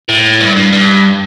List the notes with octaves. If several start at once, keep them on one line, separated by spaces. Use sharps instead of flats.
A2
G2
G2
G2